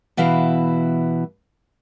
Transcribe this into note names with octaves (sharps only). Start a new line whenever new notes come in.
B2 E3 E4 F5